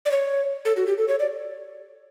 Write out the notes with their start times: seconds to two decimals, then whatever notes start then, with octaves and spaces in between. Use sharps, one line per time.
0.05 D5
0.11 C#5
0.65 A4
0.77 F#4
0.87 G4
0.98 A4
1.08 C#5
1.20 D5